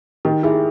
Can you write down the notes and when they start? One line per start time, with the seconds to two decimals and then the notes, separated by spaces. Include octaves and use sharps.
0.25 D#3 G4
0.43 E4 G#4